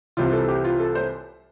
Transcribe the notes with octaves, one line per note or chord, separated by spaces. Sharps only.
C2 C3 E3 F4
A4
G4
F4
A4
C5